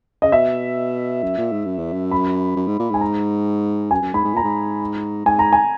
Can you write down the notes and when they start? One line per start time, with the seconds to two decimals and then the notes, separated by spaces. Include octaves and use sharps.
0.22 C#3 D#5
0.32 B2 E5
1.23 F#2
1.38 A#2
1.52 G#2
1.66 F#2
1.79 E2
1.93 F#2
2.11 B5
2.56 F#2
2.68 G#2
2.79 A#2
2.91 G#2 G#5
3.01 A#5
3.91 F#2 G#5
4.02 F#2
4.14 G#2 B5
4.24 G#2
4.34 A#2 A#5
4.43 G#2
5.26 G#2 G#5
5.39 A#5
5.53 G#5